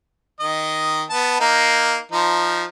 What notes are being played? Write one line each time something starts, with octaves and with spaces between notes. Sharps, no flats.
D#3 D#5
B3 A5
A#3 D#4
F3 D#4